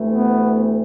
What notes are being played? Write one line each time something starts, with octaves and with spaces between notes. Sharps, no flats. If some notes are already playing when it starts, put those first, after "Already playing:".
Already playing: D2 C3 E3 A3
B3